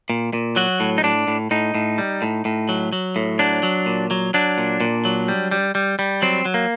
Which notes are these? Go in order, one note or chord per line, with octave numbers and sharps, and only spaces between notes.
A#2
A#2
F#3 F#4
A2
D#4
A2 D4
A2
A2 D#4
A2
G3
A2
A2
F#3
F#3
A2
F#3 D4
F#3
A#2
F#3
F#3 D4
A#2
A#2
F#3
G3
G3
G3
G3
F#3 C4
F#3
A#3